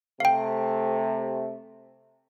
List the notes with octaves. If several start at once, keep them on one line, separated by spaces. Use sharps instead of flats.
C3 A3 F5 G5